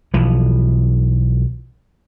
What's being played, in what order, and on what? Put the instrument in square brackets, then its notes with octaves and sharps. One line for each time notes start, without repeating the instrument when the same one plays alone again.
[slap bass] B1 E3 F3